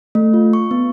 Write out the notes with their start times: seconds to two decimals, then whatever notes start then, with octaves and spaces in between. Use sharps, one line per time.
0.15 A3
0.34 F4
0.53 C#6
0.71 B3